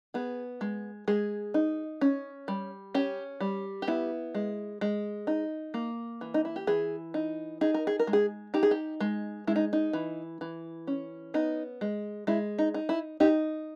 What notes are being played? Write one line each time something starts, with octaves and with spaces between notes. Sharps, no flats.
B3 G#4
G#3
G#3 G#4
D#4
C#4
G3
C#4 G4
G3
G4
B3 E4
G#3
G#3
D#4
A#3
E3
D#4
E4
G4
E3 G#4
D#4
D#4 G#4
A#4
G#4
A#4
G#3
G#4
D#4 G4
G#4
G4
G#3
G#3 E4
D#4
D#4
E3
E3
C#4
B3 D#4
G#3
G#3 E4
D#4
D#4
E4
D#4 G4